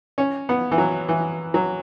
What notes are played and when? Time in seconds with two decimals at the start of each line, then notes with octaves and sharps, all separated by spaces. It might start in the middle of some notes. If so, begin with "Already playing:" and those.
0.18 C#4
0.49 B3
0.72 E3
0.78 F#3
1.09 E3
1.54 F#3